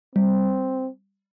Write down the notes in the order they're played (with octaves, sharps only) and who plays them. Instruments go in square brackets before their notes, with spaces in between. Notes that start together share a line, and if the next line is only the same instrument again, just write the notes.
[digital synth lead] G3 [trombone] C4